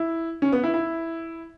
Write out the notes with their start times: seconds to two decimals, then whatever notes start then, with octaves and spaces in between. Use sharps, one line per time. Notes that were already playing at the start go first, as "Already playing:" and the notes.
Already playing: E4
0.42 C#4
0.52 B3
0.64 E4
0.74 E4